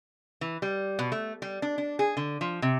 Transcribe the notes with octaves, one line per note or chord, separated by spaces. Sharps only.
E3
G3
B2
A3
G3
D4
D4
G#4
D3
F3
C3